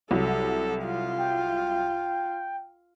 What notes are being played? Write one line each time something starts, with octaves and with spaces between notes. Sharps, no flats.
C2 F#3 A4
F4
G5